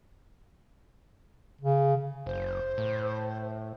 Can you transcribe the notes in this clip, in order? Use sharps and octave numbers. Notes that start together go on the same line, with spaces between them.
C#3
F#1 C5
A2